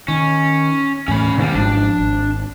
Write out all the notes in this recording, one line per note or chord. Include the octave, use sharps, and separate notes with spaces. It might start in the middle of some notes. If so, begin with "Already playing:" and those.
D#3 C#4
E2 A2 C#4 B5
C2 A#2 D#3 G3
G#1 G#2 F3 D4
G#1